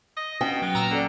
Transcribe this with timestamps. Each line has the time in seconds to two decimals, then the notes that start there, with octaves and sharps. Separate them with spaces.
0.17 D#5
0.41 B2 C#4 F#4 D#5 G5
0.62 F#3 B3
0.75 A#2 A#5 E6 F6
0.91 D3 C#4 A4 D5